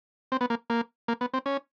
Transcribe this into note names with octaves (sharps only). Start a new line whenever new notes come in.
C4
B3
A#3
A#3
A#3
B3
C4
C#4